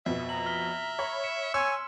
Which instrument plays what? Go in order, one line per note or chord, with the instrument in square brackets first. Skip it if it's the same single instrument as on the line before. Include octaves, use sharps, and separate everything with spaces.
[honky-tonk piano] F2 B2 [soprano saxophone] E5
[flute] A#5 [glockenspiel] F#7
[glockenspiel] F6 B6 G7
[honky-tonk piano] C#5 B5
[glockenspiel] C#7 E7
[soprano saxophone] C#5 [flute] G#5 [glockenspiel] C6 [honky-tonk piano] E6